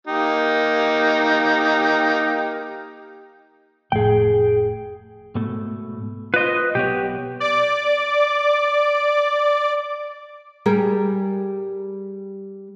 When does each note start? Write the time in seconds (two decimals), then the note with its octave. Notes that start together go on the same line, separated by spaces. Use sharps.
0.07 A#3 D#4 G4
3.92 F1 A2 G#4 G5
5.35 G#2 B2 A3
6.34 F4 B4 C5 D#5
6.75 B1 B3 G4 C#5
7.40 D5 D6
10.66 G3 G#4 A#4